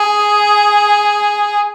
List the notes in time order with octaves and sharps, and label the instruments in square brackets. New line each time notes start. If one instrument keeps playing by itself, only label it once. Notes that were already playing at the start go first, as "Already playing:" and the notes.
Already playing: [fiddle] G#4